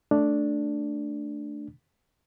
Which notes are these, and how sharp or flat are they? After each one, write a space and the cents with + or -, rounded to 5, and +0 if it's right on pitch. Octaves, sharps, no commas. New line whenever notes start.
A3 +0 D4 +0